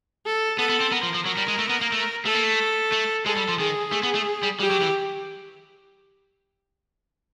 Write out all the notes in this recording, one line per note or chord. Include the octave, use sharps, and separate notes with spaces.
A4
B3 A4
B3
C4
B3 A#4
F3
F3
F#3 A#4
G3
G#3
A3
B3
A#3
A3
A3 A4
A#3
A3
A3
G#3 A4
G3
F3
D#3 G#4
A3
B3
A3
G3
G3 G4
F#3
E3